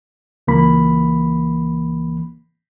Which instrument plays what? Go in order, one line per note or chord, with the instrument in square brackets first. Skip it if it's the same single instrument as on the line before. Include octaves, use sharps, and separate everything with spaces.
[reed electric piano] C#2 E3 A#3 B5